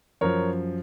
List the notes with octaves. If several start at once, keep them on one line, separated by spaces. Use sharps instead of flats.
F#2 F3 A#4 C#5